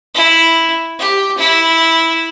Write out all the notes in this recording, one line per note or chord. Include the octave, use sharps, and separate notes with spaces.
E4
G4
E4